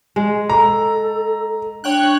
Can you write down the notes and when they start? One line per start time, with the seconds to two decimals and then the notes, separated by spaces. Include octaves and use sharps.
0.16 G#3
0.49 A4 A#5
1.84 D4 C#5 G5 F#6